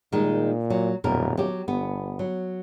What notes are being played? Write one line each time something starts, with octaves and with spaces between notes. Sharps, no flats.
A#2 D#3 G3 G#3
F#3
D#1 F#2 B2 A#4
F#3 G4
G1 B3
F#3